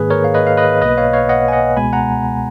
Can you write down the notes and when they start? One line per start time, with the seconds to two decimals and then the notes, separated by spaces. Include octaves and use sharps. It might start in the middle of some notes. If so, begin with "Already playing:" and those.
Already playing: G#2 D#3 A#3 G#4 B4
0.10 A#4 C#5
0.24 F5
0.34 B4 D#5
0.47 F5
0.57 B4 D#5
0.81 B1 B2 A#3 B4 D#5
0.97 C#5 F5
1.13 C#5 F5
1.29 D#5 F#5
1.48 G#5
1.52 D#5 F#5
1.77 C#2 B2 G#3 B3 G#5 B5
1.93 F#5 A#5